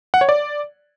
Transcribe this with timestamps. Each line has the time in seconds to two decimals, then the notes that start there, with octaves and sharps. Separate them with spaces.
0.14 F#5
0.21 C#5
0.29 D5